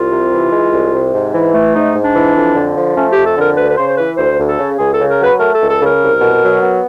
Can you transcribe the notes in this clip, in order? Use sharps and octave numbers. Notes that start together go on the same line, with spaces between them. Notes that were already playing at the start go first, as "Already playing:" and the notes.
Already playing: C2 F4
C3
E3
G#3
C2
C3
G#2
E3
A3
G#2 D#4
G#2
D4
E3
F2
D3
F3
A3 C#4
F2 G4
A4
D3 A#4
D2 B4
B4
C#3 C5
C5
E3 B4
D2 C5
D2
A4
C#3
C#2 G#4
C#3 A4
A#4
F#3 B4
A3 A#4
A4
C#2
A4
C#3 A#4
C2
B2
F#3
B3